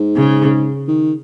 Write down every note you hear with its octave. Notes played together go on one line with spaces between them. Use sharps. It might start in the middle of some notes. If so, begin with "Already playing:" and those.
Already playing: G#2
C#3
D#3